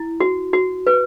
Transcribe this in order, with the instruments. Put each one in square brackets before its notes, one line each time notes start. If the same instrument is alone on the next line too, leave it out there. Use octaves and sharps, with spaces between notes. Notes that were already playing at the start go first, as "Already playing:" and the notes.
Already playing: [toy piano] E4
F#4
F#4
B4